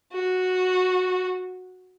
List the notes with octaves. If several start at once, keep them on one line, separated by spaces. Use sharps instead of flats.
F#4